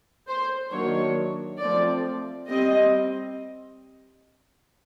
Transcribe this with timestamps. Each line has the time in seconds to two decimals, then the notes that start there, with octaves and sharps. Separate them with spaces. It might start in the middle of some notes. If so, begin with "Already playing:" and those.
0.27 C5
0.71 D#3 F#3 A#3 D4 C#5
1.59 F3 A3 C4 D5
2.47 G3 C4 D#5